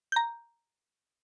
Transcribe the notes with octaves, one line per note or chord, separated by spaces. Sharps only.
A#5 G6